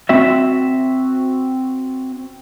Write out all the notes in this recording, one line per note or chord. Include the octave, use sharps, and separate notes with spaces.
C4 F#4 E5